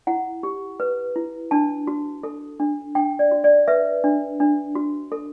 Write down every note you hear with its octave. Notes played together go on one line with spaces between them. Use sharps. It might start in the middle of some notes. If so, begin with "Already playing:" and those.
E4 F#5
G4
B4
E4
D4 A5
F#4
A4
D4
D4 G5
D5
F#4
D5
B4 E5
D4
D4
F#4
A4